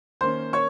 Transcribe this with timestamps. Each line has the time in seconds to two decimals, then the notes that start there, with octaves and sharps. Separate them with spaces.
0.21 D#3 A#3 C#4 C5 C6
0.53 C#5 C#6